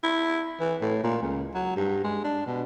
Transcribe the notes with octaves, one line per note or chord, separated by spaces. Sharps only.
E4
E3
A2
A#2
C#2
F#3
G2
G#3
D4
B2